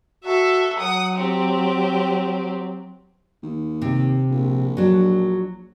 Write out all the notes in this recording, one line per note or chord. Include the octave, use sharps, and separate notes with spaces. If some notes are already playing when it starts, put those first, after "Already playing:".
F#4 A4 E5
F#3 F#5 D#6
C4 G4
D#2
C3
A#1
F#3 D4